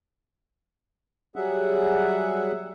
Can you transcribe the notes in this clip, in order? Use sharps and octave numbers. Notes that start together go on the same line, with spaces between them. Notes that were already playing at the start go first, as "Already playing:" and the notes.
F#3 G3 G#4 E5 F#5